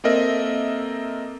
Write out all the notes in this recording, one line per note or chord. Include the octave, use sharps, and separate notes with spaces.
A#3 C4 A4 A#4 D#5 E5